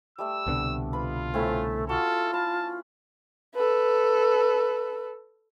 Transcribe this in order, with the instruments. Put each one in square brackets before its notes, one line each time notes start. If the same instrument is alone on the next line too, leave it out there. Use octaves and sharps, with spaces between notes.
[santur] G3 A3 E5 [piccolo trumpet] E6
[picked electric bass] C2 B2 D3
[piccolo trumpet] F4 [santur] B4 B5
[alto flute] A3 [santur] C4 C#4 E4
[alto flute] F4 [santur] F#4 [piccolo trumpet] A4
[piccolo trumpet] A5 [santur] B5
[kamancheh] A4 B4